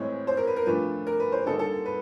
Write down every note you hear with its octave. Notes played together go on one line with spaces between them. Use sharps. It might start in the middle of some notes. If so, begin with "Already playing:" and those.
Already playing: A2 E3 G#3 C4 C#5
C5
A#4
B4
A#4
A#2 F3 A3 D4 F4 B4
A#4
B4
C5
D3 G3 A#3 D#4 A4
A4
B4